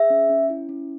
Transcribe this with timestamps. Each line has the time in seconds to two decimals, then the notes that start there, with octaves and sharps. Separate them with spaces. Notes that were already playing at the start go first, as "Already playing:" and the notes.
Already playing: G#4 E5
0.10 C#4
0.30 C#4
0.50 E4
0.69 C#4